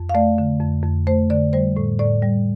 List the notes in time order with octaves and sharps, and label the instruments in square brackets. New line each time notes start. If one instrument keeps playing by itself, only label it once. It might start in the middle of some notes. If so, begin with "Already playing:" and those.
Already playing: [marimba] F2
F5
A3 D5
D3
F2
F2
A3 C5
D3 D5
G3 C5
A2
A2 D5
G3